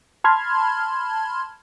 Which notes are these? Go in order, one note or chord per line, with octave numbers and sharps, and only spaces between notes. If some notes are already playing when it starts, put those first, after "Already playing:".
A5 B5 C6 F6 G#6